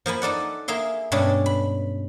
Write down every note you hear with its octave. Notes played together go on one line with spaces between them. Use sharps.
F3 A#3 G#5 B5
D#4 A4 D5 F#5
A#3 G#4 E5 C6
G2 B2 G#3 C#4 D4 A4
B5